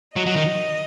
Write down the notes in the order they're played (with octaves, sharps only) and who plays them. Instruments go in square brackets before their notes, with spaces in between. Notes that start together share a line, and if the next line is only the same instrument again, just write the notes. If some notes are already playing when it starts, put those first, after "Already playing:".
[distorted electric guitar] F#3 [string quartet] D#5
[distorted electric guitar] F#3
D#3